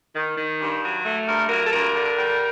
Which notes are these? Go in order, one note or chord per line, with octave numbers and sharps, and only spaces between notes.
D#3
D#3
G2
F#3
A3
G2 A#4
F#3 A#4
A4
G2 A#4
D3
G3